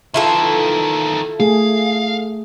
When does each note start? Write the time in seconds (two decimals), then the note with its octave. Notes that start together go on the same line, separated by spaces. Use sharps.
0.14 D#3 E3 E4 F4 A4
1.40 A3 G#4 F5